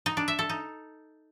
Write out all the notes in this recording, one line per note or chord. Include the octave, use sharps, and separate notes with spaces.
D#4
D4
E5
A4
D#4